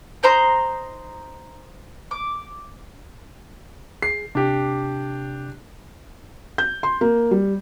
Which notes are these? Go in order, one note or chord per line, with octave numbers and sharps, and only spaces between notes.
D#4 C5 A#5 C6
D6
G#4 C7
C3 D4 G4
G6
C6
A#3
G3